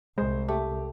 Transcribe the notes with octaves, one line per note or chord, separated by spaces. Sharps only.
C2 G#3 C5
A3 G4